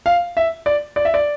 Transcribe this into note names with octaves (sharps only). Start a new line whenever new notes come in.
F5
E5
D5
D5
E5
D5